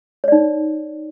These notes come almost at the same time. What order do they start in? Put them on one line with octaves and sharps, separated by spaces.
C#5 D5 D#4